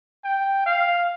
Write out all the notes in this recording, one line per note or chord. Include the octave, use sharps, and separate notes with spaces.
G5
F5